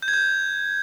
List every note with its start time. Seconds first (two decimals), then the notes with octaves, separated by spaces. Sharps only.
0.02 G6
0.08 G#6
0.13 G6